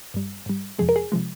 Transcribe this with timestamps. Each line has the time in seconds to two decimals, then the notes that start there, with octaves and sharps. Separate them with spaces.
0.14 G2 G3
0.46 G#2 G3
0.78 F2 C3 F3 G#3 G#4
0.89 A#4
0.96 G#4
1.12 C3 F3 G#3